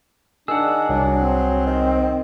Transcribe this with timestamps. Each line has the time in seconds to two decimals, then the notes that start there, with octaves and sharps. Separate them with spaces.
0.48 D#3 D4 G#4 F#5 E6
0.89 C2 F#3
1.20 C4
1.66 D#3